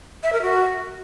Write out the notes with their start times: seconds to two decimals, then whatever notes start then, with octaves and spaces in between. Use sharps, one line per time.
0.23 E5
0.33 A#4
0.42 F#4